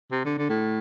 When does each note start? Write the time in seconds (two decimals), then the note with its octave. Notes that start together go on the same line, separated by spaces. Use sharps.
0.12 C3
0.25 D3
0.38 D3
0.50 A2